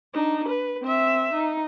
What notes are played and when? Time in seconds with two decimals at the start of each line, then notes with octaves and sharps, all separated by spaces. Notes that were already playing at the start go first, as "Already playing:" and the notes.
0.13 D4 D#4
0.48 B4
0.82 C4 E5
1.33 D#4